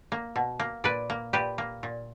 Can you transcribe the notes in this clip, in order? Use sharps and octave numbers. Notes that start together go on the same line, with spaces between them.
A#3
B2
A#3
A#2 B4 D5
A#3
A#2 G4 B4
A#3
A#2